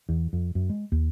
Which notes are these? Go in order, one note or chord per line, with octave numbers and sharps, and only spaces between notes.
E2
F2
F#2
G#3
D#2